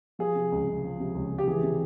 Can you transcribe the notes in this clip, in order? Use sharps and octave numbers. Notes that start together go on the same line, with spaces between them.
F3 G#4
C3
C#2
C#2
F3
C3
C#2
C#2
G4
E3 G#4
C3